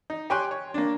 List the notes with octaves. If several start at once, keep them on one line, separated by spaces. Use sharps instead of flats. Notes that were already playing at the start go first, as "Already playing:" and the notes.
D#4
G4 C#5 G5 G#5 C6 F#6
C#5
A#3 D4